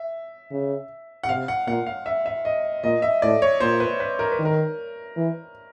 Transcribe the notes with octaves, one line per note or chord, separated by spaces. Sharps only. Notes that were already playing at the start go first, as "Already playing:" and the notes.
Already playing: E5
C#3
F#5
C3 F5
F#5
A#2 F#5
F5
E5
E5
D#5
A#2 D#5
E5
A2 D5
C#5
A#2 C5
B4
B4
A#4
B4
D#3
A#4
E3